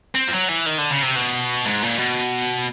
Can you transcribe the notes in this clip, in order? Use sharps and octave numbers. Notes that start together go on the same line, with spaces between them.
C4
F3
F#3
E3
D#3
D3
C#3
C3
B2
G#2
A#2
B2